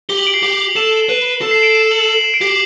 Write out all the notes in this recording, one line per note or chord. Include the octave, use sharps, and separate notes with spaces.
G4 G7
F#7
D7
C7
G4 D7
A4 E7
F#7
B4
A4
C7
D7
E7
F#7
E7
F#7
E7
D7
G4 C7